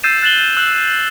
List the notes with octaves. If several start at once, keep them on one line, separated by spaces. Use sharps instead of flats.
E6 G6 A6 C7 D#7 E7
F#6 A6 E7 F#7 G7
E6 F#6 F#7